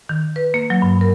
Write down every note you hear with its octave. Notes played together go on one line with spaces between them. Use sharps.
D#3
B4
A#3
F#3
G2
A#4